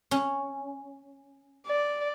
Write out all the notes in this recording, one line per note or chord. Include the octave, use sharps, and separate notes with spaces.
C#4
D5